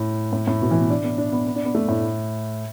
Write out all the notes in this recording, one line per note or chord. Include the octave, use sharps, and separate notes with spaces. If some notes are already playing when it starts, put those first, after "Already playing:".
Already playing: A2
A2
A2
B2
E3
B3
D4
B3
D4
B3
B3
D4
B3
A3
A2